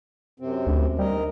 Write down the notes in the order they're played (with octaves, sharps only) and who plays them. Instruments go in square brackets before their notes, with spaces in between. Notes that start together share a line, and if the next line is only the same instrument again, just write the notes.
[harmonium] F#2 C3 C4
[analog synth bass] D2
[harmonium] D#2 A#4 D#5 [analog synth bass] G3